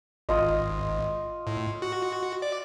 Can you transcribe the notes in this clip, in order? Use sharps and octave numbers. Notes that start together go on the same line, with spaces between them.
G#1 F4 D#5
A2
F#4
D5